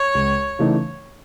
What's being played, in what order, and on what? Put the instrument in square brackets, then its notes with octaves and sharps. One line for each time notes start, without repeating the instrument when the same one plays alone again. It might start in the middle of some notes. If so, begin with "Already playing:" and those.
Already playing: [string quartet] C#5
[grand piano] C#2
C#3 E3 A3 D#4